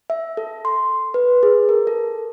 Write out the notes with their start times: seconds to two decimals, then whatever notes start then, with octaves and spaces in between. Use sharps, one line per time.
0.10 E5
0.37 A4
0.65 C6
1.14 B4
1.43 G#4
1.69 A#4
1.87 A4